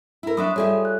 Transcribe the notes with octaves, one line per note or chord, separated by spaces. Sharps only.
E4 A#4
F#3 D4 E5 B5 C6 D#6
G3 F4 G#4 A4 C#5 E5
F#6